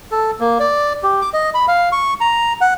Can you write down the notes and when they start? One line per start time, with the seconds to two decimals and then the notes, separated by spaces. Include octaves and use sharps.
0.12 A4
0.40 A#3
0.60 D5
1.03 G4
1.22 D6
1.34 D#5
1.54 B5
1.68 F5
1.92 C#6
2.21 A#5
2.61 F#5